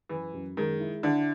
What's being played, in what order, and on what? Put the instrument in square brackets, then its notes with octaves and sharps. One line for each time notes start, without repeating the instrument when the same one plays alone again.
[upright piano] F#2 [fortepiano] E3
[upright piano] F#2
[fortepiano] D#3 [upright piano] G#3
[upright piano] E4
[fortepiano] D3 [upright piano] E4